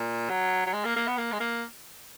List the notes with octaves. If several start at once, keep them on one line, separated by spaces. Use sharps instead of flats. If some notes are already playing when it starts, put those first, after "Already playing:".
Already playing: A#2
F#3
F#3
G#3
A#3
A#3
B3
A#3
G#3
A#3